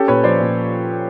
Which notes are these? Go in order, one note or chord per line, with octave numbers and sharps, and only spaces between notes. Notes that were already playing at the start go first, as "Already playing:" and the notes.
Already playing: C#4 G4 A4
A#2 B4 C#5
F3 C5 D5
A#2